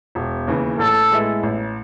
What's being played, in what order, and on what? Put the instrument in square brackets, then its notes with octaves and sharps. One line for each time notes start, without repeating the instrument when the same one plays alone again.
[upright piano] E1
D#2 C#3 E3
[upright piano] A1 [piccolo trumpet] A4
[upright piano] A2 G#3 B3 E4
A1